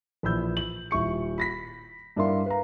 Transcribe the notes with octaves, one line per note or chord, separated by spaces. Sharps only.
A#1 E3 B5 E6 G6
F#7
D#1 E4 C#6 C#7
B5 A#6 B6
G2 D4 E4 A#4 F5 C6
B4 F5 A#5